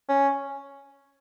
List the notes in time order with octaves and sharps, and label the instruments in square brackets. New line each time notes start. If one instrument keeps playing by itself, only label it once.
[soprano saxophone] C#4